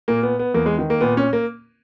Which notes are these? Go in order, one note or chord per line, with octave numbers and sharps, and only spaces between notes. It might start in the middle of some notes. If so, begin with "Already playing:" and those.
A#2 A#3
B3
B3
E2 A#3
G#3
D#3
A#3
A#2 B3
C#4
A#3